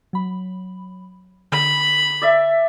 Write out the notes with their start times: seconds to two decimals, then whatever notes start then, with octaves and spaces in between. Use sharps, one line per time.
0.13 F#3 B5
1.52 D3 B5
2.22 D5 E5